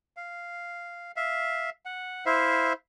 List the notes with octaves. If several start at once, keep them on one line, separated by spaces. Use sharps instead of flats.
F5
E5 F5
F#5
E4 C5 E5 F5